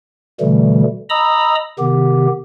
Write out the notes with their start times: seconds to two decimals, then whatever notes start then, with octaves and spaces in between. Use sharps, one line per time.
0.40 B2 D3 E3 G3 A3
1.09 D#5 A#5 B5 D#6 E6
1.79 C3 D#3 B3 G4